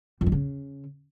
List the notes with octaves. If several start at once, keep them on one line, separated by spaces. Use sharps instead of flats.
F2
D#3
C#3